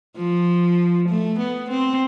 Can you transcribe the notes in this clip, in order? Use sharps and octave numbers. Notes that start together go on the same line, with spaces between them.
F3
A3
B3
C4